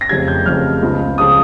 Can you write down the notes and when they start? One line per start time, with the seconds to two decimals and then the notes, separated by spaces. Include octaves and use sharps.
0.01 A#6
0.09 F1 F2 C#3 G3 G#6
0.28 G6
0.45 F1 F2 C#3 G3 F6
0.83 C#2 C#3 F3 G#3
1.18 C#3 F3 G#3 D#6